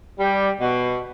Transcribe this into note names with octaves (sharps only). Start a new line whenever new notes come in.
G3
B2